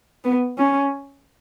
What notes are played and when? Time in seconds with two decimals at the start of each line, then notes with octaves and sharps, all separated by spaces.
0.24 B3
0.57 C#4